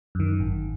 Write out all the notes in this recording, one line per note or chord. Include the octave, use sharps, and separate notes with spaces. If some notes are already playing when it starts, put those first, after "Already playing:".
F#2 D#3
G#1